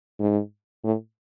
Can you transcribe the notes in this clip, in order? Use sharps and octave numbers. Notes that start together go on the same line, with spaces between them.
G#2
A2